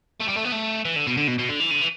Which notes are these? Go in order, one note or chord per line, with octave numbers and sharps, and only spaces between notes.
A3
G3
A3
B3
A3
E3
D3
B2
D3
B2
B2
D3
E3
D3
E3